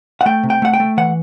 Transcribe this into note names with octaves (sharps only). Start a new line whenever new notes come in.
F#5
A3 G5
C3
G5
A3 F#5
G5
A3
E3 F#5